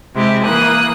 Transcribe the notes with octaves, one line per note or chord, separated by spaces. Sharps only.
C3 G#3 E4 G4
E3 A#3 D#6 F#6